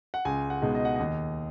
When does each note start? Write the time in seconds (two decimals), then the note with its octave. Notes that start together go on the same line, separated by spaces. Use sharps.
0.14 F#5
0.25 C#2 G#5
0.50 F#5
0.62 B2 G#3 D#4
0.75 D#5
0.85 F#5
0.96 D#2 D#5